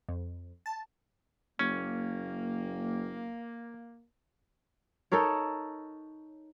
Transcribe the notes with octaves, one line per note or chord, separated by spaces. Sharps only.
F2
A5
F#1 A#3 C#4
D#4 A4 A#4 C#5